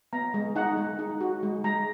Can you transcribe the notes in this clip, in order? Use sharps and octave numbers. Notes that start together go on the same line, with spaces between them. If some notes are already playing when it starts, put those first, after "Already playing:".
B3 A#5
G#3
D#4 F#5
G#3
D#4
F#4
G#3
G#3 A#5